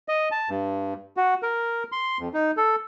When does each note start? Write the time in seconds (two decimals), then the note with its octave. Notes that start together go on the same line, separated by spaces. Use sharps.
0.08 D#5
0.31 A5
0.49 G2
1.17 F#4
1.43 A#4
1.92 C6
2.19 F2
2.34 D#4
2.57 A4